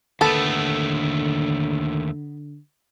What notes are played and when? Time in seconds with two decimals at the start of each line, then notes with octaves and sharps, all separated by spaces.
0.21 D#2 D3 A3 B3 A4